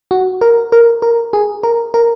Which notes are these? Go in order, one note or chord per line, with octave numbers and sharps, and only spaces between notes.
F#4
A#4
A#4
A#4
G#4
A#4
A#4